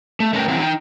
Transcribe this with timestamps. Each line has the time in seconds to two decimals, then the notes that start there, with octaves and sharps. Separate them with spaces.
0.20 A3
0.33 A3 C#4 A#4 B4 G5
0.48 E3 F#3 C4 E4
0.60 D#4 G5